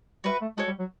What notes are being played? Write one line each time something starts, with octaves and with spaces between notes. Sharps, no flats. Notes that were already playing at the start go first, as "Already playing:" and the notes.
G3 F#4 B4 E5
A3
G#3 F#4 A4 C#5
G3
F#3